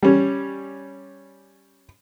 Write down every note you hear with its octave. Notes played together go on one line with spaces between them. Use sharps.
G3 C#4